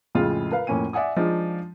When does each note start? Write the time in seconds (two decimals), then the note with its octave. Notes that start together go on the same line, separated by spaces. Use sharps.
0.15 F2 A2 C#3 G#3 F4
0.52 A#4 B4 F5
0.67 F2 A2 A#3 C#4 G#5 D#7
0.93 D5 E5 F#5 G#5 D#6
1.16 F3 G#3 D4 D#4 F4